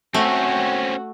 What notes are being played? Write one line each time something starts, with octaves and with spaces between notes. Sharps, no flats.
A3 C4 C#4 F#4